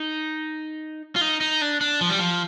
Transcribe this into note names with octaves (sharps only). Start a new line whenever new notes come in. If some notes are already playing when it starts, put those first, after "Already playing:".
Already playing: D#4
F4
D#4
D#4
D4
D4
F3
G3
F3